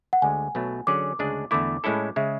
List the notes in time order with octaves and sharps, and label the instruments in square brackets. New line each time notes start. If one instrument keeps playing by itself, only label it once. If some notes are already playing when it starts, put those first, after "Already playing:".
[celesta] F#5
[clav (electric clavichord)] D2 D3 G#3 [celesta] G#5
[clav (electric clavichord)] B1 B2 F#3 A3
[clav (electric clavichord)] D3 F#3 C#4 G#4 D5 [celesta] D6
[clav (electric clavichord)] D2 C#3 G#3 D4 G#4
[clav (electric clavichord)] E2 D3 A3 E4 [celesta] D6
[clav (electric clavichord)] A2 G#3 C#4 E4 A4
[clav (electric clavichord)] C#3 G#3 [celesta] E5